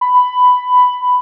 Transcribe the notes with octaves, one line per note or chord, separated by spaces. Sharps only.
B5